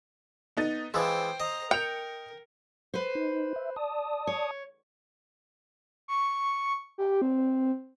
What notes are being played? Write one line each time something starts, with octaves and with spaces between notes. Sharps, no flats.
B3 D#4 A6
E3 F3 G#3 C5 G5 E6
C5 D#5 A#5
A#4 G5 C#7 F7
B4 C5
D#4
E5
D5 A5 D#6
C#5
C#6
G4
C4